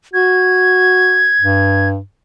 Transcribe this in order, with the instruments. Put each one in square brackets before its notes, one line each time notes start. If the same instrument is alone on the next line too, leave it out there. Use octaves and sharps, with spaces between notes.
[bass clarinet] F#4 [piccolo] G#6
[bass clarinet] G2